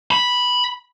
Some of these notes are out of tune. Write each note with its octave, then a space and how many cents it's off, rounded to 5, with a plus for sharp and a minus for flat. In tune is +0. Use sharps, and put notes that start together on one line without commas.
B5 -5